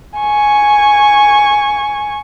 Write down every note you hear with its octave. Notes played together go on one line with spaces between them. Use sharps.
G#5 C#6